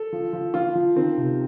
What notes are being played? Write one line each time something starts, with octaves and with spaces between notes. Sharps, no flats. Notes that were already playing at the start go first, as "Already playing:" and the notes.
Already playing: A4
F3
F3
F3 F4
F3
D#3 C4
C3